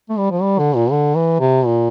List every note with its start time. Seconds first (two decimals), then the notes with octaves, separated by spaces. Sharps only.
0.10 A3
0.18 G3
0.31 F3
0.42 G3
0.59 D3
0.75 A#2
0.91 D3
1.17 E3
1.40 C3
1.66 A#2